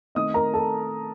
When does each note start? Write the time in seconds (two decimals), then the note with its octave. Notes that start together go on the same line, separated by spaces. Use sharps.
0.15 D#3 A3 C4 D#5 D#6
0.34 A#4 A#5
0.53 A4 A5